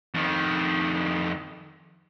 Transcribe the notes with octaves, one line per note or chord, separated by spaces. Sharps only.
F2 D#3